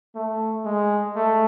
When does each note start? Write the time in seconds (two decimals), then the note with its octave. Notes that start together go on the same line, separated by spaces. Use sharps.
0.15 A3
0.65 G#3
1.16 A3